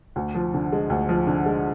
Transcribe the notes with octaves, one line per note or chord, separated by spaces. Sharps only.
D2
F3
D3
G#3
D2
F3
D3
G#3